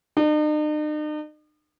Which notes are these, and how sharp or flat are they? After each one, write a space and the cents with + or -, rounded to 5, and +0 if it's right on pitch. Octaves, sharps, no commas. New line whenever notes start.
D#4 -45